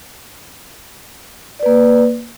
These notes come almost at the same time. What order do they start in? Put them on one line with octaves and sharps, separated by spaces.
D5 B4 A#3